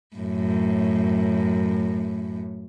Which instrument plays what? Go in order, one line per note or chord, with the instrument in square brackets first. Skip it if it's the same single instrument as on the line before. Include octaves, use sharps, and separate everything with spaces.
[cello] F#2 A2